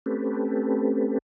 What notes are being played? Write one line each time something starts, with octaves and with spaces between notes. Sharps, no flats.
A3 C4 C#4 G4 A4 B4